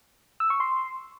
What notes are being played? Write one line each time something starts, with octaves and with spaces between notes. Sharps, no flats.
E6
C#6
C6